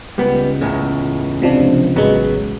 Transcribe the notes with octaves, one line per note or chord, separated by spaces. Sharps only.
C#2 G3 B3
E2 A2 C#3
C3 F3 D4
A1 F#3 G#3 B3